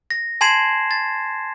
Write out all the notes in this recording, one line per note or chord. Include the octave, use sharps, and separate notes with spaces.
A#6
G#5 A5 C6 G#6 C7 E7
A6